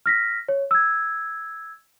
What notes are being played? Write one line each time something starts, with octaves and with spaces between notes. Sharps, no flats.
F6 A#6 B6
C#5
E6 G#6